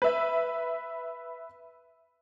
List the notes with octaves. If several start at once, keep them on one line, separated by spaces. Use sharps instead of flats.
B4 E5